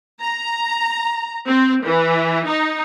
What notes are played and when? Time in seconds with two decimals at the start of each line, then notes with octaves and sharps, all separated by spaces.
0.21 A#5
1.48 C4
1.85 E3
2.48 D#4